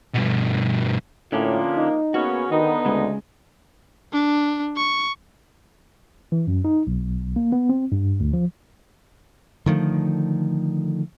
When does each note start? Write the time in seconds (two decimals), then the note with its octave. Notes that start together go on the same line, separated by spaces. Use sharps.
0.15 G2 B2
1.32 A2 D3 F3 G#3 A#3 C#4 D4 F4
1.77 D#4
2.14 C#3 A#3 B3 C#4 F#4
2.51 D3 D#3 B3 D#4
2.85 D2 C#3 G#3
4.13 D4
4.77 C#6
6.32 E3
6.47 F#2
6.65 D#4
6.87 B1
7.36 A#3
7.52 B3
7.69 C4
7.92 G2
8.20 D2
8.33 F3
9.66 D3 D#3 F3 A3